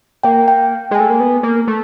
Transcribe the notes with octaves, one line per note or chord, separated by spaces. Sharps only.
A#3 G5
G5
G#3 G#5
A3
A#3
B3
A#3
A3